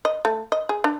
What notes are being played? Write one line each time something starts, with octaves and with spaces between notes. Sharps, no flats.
D#5
A3
D#5
G#4
D4